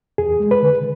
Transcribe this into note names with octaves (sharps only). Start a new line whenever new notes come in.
E2 G#4
G#3
B4
D3